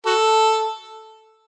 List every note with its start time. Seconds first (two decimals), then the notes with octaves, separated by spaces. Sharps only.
0.06 F#4 A4